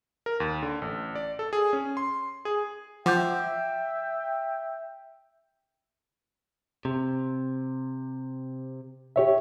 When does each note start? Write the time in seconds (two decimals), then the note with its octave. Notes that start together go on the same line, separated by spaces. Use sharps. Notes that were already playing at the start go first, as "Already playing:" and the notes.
0.26 A#4
0.40 D#2
0.63 D3
0.82 A1
1.15 D5
1.39 A4
1.53 G#4
1.73 C#4
1.97 C6
2.45 G#4
3.06 F3 E5 F#5 G5 D6 G6
6.85 C3
9.16 G4 C#5 E5